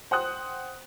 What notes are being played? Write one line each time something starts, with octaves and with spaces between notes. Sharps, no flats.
C5 F#5 G5 D#6 F#6